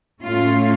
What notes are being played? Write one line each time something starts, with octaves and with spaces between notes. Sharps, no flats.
A2 A3 C#4 F4